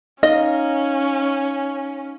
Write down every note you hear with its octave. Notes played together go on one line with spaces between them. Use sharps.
C#4 D#4 D#5 F5